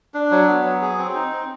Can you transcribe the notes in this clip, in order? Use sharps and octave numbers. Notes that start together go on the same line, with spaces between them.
D4
F#3
B3
F#3
G#4
C4
D#4
C4